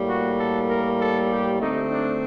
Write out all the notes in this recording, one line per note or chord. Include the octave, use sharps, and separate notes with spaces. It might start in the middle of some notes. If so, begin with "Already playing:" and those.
Already playing: A2 G3 A#3
F#4
A4
A#4
A4
G4
D3 A3 C4 D#4
D4